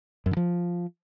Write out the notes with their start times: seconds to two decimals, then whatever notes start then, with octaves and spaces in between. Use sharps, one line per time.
0.26 F#2
0.31 D3
0.37 F3